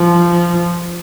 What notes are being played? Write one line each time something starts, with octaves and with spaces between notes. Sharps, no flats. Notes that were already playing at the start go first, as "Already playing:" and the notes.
Already playing: F3